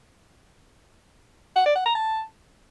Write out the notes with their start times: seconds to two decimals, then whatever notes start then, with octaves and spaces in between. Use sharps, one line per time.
1.56 F#5
1.66 D5
1.76 F#5
1.85 A#5
1.95 A5